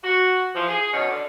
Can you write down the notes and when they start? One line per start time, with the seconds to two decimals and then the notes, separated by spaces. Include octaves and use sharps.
0.03 F#4
0.55 E3 F3
0.68 G#4
0.92 B2 D#3 C#4
1.09 D3